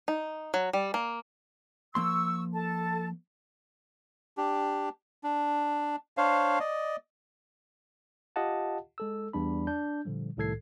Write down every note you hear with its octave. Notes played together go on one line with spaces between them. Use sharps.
D#4
F#3
G3
A#3
F3 A#3 C6 C#6 E6
A4 A5
D4 G4
D4
D4 C5 C#5 F5
D5 D#5
F4 G4 D#5 F5 F#5 A5
G#3 A4 E6
E2 G3 D4 B5
D4 G6
A#2 D3 F3 G3
C2 A2 D#3 A4 G#6 C7